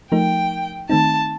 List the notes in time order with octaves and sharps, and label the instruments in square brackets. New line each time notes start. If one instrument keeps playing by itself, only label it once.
[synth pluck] F3 A3 D#4 A#4 [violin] G5
[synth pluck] D#3 A3 C4 D#4 [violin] A5